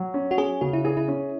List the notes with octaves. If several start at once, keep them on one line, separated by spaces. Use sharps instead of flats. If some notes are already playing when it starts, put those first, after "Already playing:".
Already playing: F#3
C#4
F#4
C#4 G#4
C#3 F#4
E4
E4 G#4
E4
C#4